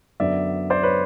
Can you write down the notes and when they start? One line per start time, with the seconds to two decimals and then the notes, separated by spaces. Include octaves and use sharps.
0.20 F#2 D3 F#3 B3 D5 E5
0.70 C5 D5
0.83 B4 C#5